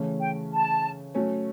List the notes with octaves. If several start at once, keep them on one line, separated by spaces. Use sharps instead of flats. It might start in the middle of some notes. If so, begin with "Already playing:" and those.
Already playing: C#3 E3 A3 C#4
G5
A5
F#3 A3 C#4